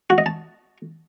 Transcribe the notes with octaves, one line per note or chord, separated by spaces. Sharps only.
F#4
D#5
A5